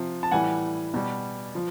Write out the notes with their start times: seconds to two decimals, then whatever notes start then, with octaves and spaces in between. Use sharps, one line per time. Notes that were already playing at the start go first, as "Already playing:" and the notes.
Already playing: C3 F3
0.23 A5
0.31 A2 E3 G3 F#5 G#5
0.94 B2 G3
1.55 F3